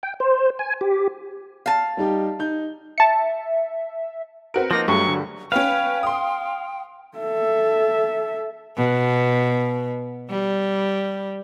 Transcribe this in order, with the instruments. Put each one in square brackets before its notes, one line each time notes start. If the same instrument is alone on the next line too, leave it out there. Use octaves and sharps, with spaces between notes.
[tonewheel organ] G5
C5
G#5
G4
[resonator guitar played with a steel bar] F5 A5
[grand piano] G3 D#4 G4
D#4 G6
[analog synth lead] E5 [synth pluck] A5 C#7
[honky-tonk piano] C4 F#4 A#4 [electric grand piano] B4 D7
[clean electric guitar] F3 A#3 D#4 [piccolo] A#6
[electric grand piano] G2 A3 [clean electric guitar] F#3 [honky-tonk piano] G3 G#4 [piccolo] C#6
[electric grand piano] G2 D3
[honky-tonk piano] C#4 B4 [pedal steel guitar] F5 [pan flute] G5
[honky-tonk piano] C6 D#6
[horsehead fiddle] A4 E5
[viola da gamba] B2
G3